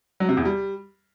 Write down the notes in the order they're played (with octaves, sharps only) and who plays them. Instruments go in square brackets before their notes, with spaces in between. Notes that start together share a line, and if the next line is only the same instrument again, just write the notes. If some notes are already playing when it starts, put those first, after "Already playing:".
[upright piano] F#3
C3
E2
G3